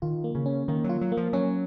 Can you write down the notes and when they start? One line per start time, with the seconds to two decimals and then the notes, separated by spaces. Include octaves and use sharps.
0.02 D#3 F4
0.24 A#3
0.35 C#3
0.46 C#4
0.68 D#3 A#3
0.84 F#3
0.89 F4
1.01 F#3
1.12 A#3
1.17 F3
1.33 F#3 C#4